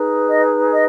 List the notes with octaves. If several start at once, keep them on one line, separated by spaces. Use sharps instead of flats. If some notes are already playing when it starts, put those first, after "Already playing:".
Already playing: D#4 G#4 B4
D#5
D#5